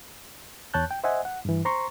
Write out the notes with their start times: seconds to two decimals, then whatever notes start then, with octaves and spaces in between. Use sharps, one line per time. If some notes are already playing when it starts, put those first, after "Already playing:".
0.74 E2 C#5 A5 F#6 G6
0.91 G5
1.04 C5 D#5 E5 F#5 G#5
1.25 F#5
1.45 G2 E3
1.65 C5 A#5 C6 C#6